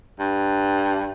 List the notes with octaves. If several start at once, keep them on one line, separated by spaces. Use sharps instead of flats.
G2